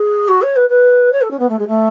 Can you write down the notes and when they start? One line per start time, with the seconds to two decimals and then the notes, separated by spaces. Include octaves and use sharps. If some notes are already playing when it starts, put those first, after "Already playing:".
Already playing: G#4
0.28 F#4
0.42 C#5
0.56 B4
0.69 B4
1.12 C#5
1.22 A4
1.31 C#4
1.39 B3
1.49 A3
1.59 G#3
1.68 A3